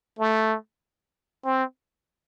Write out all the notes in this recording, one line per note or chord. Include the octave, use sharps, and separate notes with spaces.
A3
C4